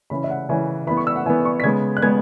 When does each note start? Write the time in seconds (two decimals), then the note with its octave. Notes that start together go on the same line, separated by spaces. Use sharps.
0.10 C#3 E3 C#4 B5
0.24 E5
0.30 F#5
0.49 C#3 E3 C#4 G#5
0.87 E3 B3 B5
0.97 C#6
1.07 E6
1.16 F#5
1.25 E3 B3 G#5
1.45 C#6
1.60 B6
1.63 C#3 G#3 B3 G#6
1.97 F#6
2.02 C#3 G#3 B3 G#6